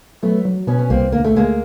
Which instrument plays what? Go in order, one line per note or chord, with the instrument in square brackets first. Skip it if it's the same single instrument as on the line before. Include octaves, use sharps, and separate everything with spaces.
[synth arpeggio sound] F#3 [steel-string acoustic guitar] A3 B3
[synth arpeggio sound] F#3
[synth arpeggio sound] B2 [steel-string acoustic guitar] B3 C#4
[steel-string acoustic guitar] C#4
[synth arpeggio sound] C2 [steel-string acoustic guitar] A#3 C4
[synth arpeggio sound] D2 [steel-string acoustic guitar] A#3
[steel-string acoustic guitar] A3
[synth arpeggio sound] D2 [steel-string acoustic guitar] G#3 A#3